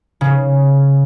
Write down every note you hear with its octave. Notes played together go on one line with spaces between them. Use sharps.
C#3